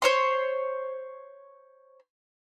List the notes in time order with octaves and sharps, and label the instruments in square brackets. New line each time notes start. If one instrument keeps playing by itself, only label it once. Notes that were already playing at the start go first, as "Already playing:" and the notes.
[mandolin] C5 C#5 C6